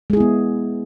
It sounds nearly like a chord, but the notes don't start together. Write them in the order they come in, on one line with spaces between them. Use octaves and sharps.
G#3 G#4 E4 B3